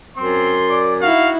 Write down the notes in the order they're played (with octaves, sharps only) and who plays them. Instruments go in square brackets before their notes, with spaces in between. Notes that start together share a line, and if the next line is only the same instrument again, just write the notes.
[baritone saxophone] F#2 [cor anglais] C4 [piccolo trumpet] C6
[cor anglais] D5
[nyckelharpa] D#4 E4 [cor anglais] F#4 [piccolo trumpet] F5